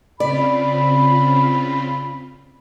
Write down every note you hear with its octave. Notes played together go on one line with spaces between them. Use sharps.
C#3 C4 F4 D5 B5